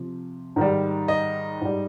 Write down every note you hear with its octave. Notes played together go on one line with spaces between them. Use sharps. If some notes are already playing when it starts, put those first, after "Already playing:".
Already playing: C3 F3
G#2 D#3 G3
D#5
G#2 G3